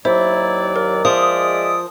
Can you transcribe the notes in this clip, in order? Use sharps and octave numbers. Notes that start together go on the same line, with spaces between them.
D#2 F#3 E4 C5 D5
A#4
F3 G#3 D5 E5 D#6